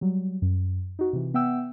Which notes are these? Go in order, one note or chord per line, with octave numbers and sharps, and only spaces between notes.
F#3 G3
F#2
D#4 F#4
C3 E3
B3 E5 F#5 G5 E6